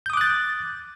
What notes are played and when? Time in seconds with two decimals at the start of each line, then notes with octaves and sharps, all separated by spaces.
0.06 G6
0.10 D#6
0.13 D6
0.17 F#6
0.21 A6